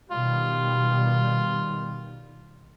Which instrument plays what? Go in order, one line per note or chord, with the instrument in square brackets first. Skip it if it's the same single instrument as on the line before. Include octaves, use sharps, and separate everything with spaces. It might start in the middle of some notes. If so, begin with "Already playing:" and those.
[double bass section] B2 D#3 G3 [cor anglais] F4